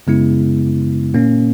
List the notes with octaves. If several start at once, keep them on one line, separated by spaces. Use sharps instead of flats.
F#2 C#3 G#3 B3 E4
A#2 A#3 C#4